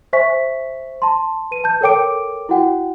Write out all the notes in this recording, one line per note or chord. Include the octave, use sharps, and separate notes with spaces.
C5 E5 G#5 C#6 B6
A5 C6
B4 D#7
A5 G6
A4 A#4 C#5 G5 D6 D7
E4 F#4 F#5 G5